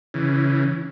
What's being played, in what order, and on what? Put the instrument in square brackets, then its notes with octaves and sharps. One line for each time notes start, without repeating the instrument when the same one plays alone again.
[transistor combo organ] C#3 E3